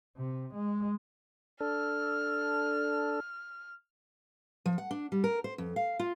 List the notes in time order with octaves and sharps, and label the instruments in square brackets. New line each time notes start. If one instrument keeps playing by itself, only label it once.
[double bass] C3
G#3
[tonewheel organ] D4 A4 [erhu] F6
[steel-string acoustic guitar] F3
F#5
D4
G3
A#4
C5
F2
F5
F4